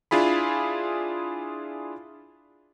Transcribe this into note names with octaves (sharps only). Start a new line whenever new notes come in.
D4 E4 F4 G#4 B5